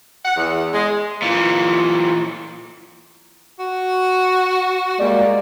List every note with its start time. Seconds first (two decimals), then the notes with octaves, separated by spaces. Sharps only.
0.24 F#5
0.36 E2
0.73 G#3
1.22 A#2 E3
3.59 F#4
5.00 G3 G#3 A#3 D5